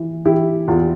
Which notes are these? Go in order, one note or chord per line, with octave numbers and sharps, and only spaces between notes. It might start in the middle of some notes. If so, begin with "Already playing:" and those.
Already playing: E3
E3 E4 G4
E2 F4